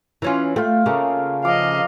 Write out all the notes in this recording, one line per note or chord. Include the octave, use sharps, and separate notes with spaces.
E3 C#4 F4
A3 F4 G5
C#3 A3 A#3
F3 D#5 F5 D6